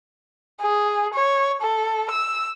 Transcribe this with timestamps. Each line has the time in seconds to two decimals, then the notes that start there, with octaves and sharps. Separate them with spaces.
0.61 G#4
1.14 C#5
1.62 A4
2.11 E6